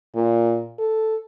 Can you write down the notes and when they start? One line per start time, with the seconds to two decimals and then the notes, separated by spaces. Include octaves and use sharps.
0.15 A#2
0.79 A4